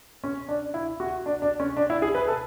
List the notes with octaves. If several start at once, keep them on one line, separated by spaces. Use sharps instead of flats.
C#4
D4
E4
F#4
D4
D4
C#4
D4
E4
G#4
B4
A4